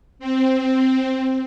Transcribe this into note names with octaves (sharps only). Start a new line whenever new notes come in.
C4